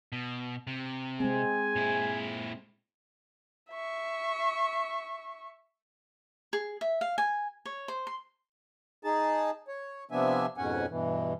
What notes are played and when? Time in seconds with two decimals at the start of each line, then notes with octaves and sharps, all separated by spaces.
0.12 B2
0.67 C3
1.20 G#3 C4 G#4 G#5
1.76 A#2 E4
3.70 E5 C#6
6.53 G#4
6.81 E5
7.01 F5
7.18 G#5
7.65 C#5
7.88 C5
8.07 C6
9.03 D#4 G#4 A5
9.68 C#5
10.11 C3 F3 B3 D4 E5 G#5
10.58 F2 G#2 B2 C#4 F#5 G#5
10.89 G2 B2 E3